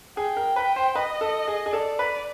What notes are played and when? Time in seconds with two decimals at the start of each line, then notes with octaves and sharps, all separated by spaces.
0.17 G#4 G5
0.37 A#4
0.56 B4
0.76 C5
0.95 B4 D#5
1.21 A4
1.48 G#4
1.66 G#4
1.73 A4 D5
1.99 B4